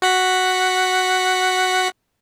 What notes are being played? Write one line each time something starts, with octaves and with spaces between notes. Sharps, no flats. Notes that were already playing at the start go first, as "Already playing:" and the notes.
F#4 F#5 B6